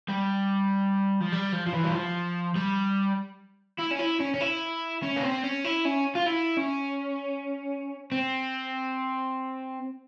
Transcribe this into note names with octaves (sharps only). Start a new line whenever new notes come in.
G3
F3
G3
F3
F3
E3
G3
F3
G3
E4
C#4
E4
C#4
C#4
E4
C#4
A#3
C4
C#4
E4
C#4
F4
E4
C#4
C4